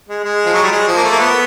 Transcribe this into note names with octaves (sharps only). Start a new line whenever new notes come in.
G#3
G#3
F3
F#3
G3
G#3
F3
A#3
A3
A#3
B3